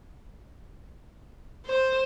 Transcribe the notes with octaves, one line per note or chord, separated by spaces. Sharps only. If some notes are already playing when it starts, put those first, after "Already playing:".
C5